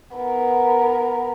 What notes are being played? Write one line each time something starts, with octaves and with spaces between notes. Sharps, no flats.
B3 A#4